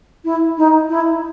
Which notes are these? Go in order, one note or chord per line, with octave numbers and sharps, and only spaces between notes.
E4
D#4
E4